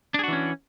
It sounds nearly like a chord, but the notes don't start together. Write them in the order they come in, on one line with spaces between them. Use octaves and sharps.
D4 G#4 F#4 E3 C#4